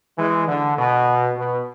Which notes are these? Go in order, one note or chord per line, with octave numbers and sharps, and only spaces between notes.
E3 G#3
D3
B2
B2